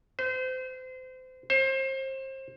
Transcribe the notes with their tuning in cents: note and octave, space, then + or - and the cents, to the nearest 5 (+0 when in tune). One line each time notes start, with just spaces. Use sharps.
C5 -30
C5 +30